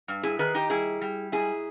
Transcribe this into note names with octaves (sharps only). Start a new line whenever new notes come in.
G2
E4 G#4
D#3 G#4 B4
D#4 G4
G3 E4 G#4
G3
G#2 E4 G#4